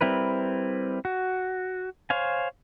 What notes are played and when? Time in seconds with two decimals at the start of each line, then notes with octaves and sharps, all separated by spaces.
0.01 G3 C4 E4 A#4 B4
1.05 F#4
2.10 C5 C#5 F5 G#5